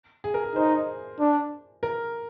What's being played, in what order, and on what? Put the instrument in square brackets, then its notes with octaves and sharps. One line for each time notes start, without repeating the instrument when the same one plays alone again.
[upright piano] G#4
A#4
G#4
[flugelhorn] D#4 [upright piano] C5
[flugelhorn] D4
[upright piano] A#4